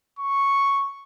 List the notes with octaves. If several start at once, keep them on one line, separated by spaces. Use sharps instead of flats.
C#6